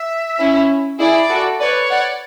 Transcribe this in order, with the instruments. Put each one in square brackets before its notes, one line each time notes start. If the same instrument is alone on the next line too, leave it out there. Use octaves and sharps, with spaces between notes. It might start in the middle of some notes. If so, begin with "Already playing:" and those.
Already playing: [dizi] E5
[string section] C#4 E4
[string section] E4 G#4 [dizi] D5
[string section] F#4 A4
[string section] B4 D5 [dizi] C#5
[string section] D5 F#5